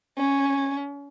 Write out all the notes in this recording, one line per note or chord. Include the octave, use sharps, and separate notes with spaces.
C#4